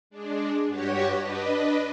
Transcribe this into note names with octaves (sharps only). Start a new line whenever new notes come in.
G#3 D4
G2 F#4 G4 C#5 F#5
D4 B4 D#5